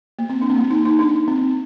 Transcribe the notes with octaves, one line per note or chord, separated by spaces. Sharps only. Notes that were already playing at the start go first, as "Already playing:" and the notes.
A#3
C4
D4
C4
A#3
D#4
D#4
D4
C4